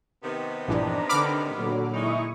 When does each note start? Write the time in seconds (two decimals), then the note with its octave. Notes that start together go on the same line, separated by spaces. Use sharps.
0.23 C3 D#3 B3
0.68 A#1 G2 E3 D4 A#5
1.09 D3 B5 D6 F6
1.55 A#2 D3 F#3
1.94 G#3 D#4 E4 C#6 D#6